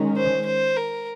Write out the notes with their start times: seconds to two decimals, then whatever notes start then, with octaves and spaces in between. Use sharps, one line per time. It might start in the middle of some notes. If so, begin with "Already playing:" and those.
Already playing: D#3 G#3 C#4
0.16 C5
0.46 C5
0.76 A#4